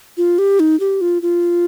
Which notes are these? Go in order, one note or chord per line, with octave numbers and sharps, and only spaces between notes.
F4
G4
D#4
G4
F4
F4